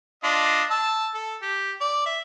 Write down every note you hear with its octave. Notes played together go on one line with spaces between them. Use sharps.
D4 F4 D#5
A5 E6
A4
G4
D5
E5